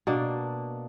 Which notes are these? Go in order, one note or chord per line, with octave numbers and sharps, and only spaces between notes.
B2 A#3 D4